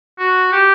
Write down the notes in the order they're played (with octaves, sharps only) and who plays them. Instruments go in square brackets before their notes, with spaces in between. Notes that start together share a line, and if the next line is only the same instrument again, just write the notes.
[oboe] F#4
G4